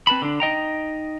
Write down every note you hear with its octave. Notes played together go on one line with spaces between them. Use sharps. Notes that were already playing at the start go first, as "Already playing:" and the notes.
C4 B4 A5 B5
D3 D4
D#4 D#5 G5 A#5